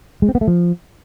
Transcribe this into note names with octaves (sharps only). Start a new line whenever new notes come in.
G#3
C4
B3
A3
F3